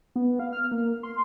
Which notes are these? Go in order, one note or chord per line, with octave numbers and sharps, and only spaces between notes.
B3
F5
F6
A#3
C6